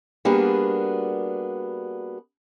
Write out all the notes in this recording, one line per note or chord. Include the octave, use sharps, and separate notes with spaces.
G3 A#3 B3 D4 F#4 G#4